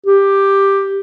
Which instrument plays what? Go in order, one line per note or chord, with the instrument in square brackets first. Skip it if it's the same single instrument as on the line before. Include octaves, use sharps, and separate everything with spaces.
[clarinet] G4